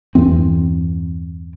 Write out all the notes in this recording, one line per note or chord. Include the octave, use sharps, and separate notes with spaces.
E2 G2 E3 C4